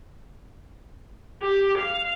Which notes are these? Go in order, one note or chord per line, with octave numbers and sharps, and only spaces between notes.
G4
F5